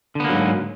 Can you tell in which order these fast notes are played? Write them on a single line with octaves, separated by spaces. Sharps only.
D3 B3 A#3 F#3 G#2